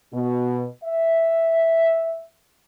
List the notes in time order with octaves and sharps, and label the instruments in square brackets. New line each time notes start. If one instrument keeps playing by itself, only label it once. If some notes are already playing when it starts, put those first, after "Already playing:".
[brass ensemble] B2
E5